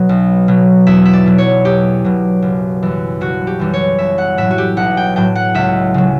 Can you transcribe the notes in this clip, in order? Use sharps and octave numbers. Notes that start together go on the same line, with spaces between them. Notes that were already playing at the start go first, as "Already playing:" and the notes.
Already playing: B2 F#3
B1
B2 F#3
E2 E5
E5
D5
B2 F#3
C#5
E2 G4
B2 F#3
F#1
F#2 E3 G3
F#1 F#4
G4
F#2 E3 G3
C#5
B1 E5
F#5
A2 F#3 E5
F#4
G4
B1 F#5
G5
A2 F#3 G5
F#5
C#2 E5
C#3 F#3